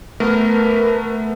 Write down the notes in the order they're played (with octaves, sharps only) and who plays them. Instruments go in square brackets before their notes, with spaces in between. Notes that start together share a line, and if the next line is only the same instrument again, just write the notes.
[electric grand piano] A3 B3 [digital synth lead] A#4 [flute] B4